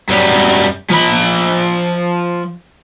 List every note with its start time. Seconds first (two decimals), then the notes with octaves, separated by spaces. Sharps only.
0.09 F#2 G3
0.90 F3 B5